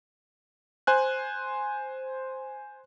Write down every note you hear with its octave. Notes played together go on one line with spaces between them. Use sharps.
C5 G#5 F#6